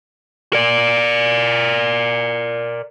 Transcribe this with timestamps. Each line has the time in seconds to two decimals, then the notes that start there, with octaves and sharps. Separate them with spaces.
0.53 A#4 D5